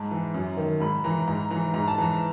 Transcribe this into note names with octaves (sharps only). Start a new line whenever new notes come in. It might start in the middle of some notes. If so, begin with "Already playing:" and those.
Already playing: G#2 A5
E3
F#2
D#3
G#2 B5
E3 A#5
G#2 A#5
E3 A#5
G#2 A#5
A5
E3 A#5